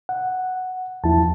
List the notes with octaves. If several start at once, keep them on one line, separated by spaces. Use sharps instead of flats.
F#5
E2 A#2 F3 E4 A5